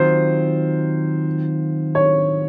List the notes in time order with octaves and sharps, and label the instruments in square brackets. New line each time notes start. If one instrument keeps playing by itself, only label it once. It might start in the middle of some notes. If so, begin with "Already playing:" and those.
Already playing: [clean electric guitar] D#3 F#3 C4 F4 [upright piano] C5
[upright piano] C#5